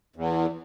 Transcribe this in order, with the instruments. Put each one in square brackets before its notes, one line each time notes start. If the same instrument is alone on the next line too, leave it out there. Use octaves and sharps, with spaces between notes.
[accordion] E2